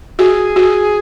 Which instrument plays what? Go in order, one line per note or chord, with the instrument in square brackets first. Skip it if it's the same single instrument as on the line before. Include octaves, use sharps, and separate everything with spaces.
[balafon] F#4 [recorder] G#4
[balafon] F#4